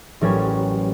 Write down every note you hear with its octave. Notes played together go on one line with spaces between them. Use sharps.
A1 F#3 G3 C#4 A#4 G#6